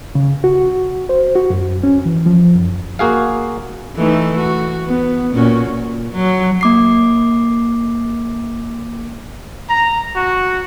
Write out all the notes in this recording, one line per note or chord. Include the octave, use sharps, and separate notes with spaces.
C#3
F#4
C5
F#4
F#2
C#4
E3
F3
F#2
A#3 F#4 G#4 F5
E3 A3 D#4
F#4
B3
A#2 C#4 F#4
A#2
F#3
A#3 D6 C7
A#5
F#4